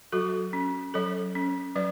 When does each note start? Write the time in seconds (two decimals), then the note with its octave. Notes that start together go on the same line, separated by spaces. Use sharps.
0.12 F#3 F#4 A4
0.53 C#4
0.94 F#3 A4 C#5
1.35 C#4
1.76 F#3 B4 D5